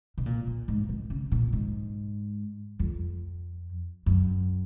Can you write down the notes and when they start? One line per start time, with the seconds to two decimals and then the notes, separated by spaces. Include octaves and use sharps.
0.18 B2
0.26 A#2
0.47 A#2
0.68 G#2
0.89 B2
1.10 C#3
1.32 A#2
1.53 G#2
2.79 F2
4.06 F#2